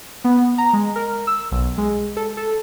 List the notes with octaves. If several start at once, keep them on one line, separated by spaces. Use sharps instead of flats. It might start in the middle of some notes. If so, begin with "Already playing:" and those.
B3
A#5
G#3
A#4
E6
B1
G#3
A4
A4